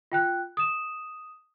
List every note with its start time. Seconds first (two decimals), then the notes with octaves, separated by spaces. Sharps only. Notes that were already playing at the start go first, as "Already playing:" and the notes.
0.12 F4 G5 F#6
0.57 D#6 E7